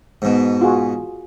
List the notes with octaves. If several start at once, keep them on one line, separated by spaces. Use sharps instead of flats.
G#2 B2
F4 F#4 G#4